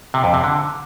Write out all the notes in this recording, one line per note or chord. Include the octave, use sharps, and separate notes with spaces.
C3
F2
C3
D3